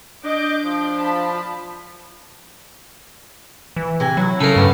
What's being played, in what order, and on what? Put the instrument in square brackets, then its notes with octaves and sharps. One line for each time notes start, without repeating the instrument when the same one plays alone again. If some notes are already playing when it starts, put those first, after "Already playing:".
[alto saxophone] D4 [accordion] D#5 [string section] D6 G6
[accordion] F3
[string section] F4 A5 B5
[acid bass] E3
[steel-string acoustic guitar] C3 G#5
[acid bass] F#3 [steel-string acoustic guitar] E4
[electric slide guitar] C#3 [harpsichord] A4 A#4
[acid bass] G2 [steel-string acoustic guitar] A3 B3